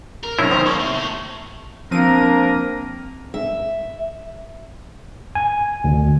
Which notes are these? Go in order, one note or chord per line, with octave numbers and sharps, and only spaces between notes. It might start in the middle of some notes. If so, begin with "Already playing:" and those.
A#4
B1 C4 C#4 E4
D#3 C5
G3 A#3 C#6
C3
A2
F3 A#3 C4 D4 A#4 D#7
E5
G#5
D2